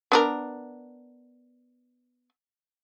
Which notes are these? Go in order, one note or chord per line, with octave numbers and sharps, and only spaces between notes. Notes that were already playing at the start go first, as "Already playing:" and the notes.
B3 D4 A#4